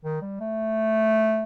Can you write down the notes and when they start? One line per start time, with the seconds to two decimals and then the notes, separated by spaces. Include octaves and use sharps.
0.04 D#3
0.22 G3
0.40 A3